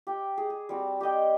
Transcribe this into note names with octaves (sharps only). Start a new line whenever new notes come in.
G4 G5
G#4
G#4
G3 C4 F#4
G4 D5 D#5 G5